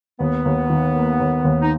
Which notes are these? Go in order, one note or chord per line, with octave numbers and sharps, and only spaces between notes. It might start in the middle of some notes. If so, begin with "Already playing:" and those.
D#2 B3
D#2
D#3
A#3
D#2
D#2
D#4